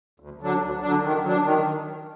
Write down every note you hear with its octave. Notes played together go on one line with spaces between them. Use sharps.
D2
D3 F#3 D4
D2
D3 F#3 D4
D#3
F#3 D4
D#3